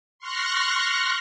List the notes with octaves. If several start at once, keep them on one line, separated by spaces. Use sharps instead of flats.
C6 C#6 F6 F#6 A#6